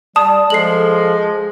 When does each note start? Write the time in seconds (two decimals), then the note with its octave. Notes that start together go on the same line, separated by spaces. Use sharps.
0.16 G3 D5 A5 D#6
0.50 F3 G#3 A4 C7 F#7